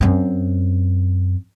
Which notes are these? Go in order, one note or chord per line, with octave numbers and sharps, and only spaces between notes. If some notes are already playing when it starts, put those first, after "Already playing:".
F#2 C4